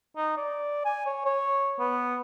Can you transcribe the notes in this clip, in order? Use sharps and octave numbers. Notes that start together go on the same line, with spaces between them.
D#4
D5
G#5
C#5
C#5
B3